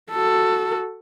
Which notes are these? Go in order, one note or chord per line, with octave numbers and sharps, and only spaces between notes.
F#4 A4